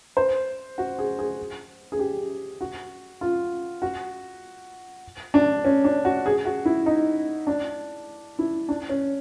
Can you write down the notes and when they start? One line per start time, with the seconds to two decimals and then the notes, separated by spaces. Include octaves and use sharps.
0.17 C5
0.78 F#4
0.99 G#4
1.19 G#4
1.92 G#4
1.99 G4
2.61 F#4
3.21 F4
3.82 F#4
5.34 D4
5.65 C#4
5.84 D4
6.05 F#4
6.26 G#4
6.45 F#4
6.65 E4
6.86 D#4
7.47 D4
8.39 E4
8.69 D4
8.89 C#4